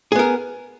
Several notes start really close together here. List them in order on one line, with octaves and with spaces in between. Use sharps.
G#4 B3 A#4